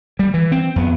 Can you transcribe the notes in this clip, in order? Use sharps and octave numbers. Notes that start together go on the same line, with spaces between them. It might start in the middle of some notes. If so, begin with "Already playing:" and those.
G3
E3
C4
F2 B3